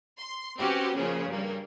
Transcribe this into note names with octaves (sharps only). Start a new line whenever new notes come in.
C6
C4 C#4 F#4 G4 B4
A#2 C#3 F3 C#4 G#4
G2 G3 A#3